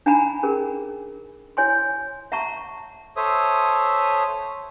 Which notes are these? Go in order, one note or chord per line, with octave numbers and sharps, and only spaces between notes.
D4 D#4 F#5 G#5 A#5 B5
C#4 G#4 A#4
E4 C#5 G#5 C6
E5 F#5 A5 A#5 C#6
A4 C5 C#5 E5 D#6